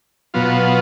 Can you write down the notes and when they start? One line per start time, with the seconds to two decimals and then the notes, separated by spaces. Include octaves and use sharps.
0.34 B2 F#3 B3 F4